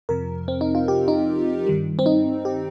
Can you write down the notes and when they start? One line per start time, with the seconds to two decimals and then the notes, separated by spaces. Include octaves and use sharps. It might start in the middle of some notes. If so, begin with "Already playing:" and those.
0.09 F2 C3 F3 A#4
0.48 C4
0.61 D#4
0.75 F4
0.88 G4
1.08 D#4
1.67 G2 D#3 G3
1.99 C4
2.06 D#4
2.45 G4